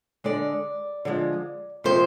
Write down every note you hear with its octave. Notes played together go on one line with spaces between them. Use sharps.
D3 G#3 D5
D3 F3 G#3
C3 F3 G#3 C5